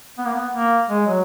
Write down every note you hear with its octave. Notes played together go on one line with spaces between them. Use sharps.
B3
A#3
B3
A#3
G#3
F#3